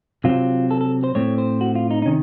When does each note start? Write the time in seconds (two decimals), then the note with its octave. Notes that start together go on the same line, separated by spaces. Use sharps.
0.24 C3 F#3 C4 F4
0.71 A4
0.81 A4
1.04 C5
1.15 A2 A3 C4 C#5
1.38 C5
1.61 F#4
1.75 F4
1.91 D#4
2.02 D#4
2.06 C3 D#3 C#4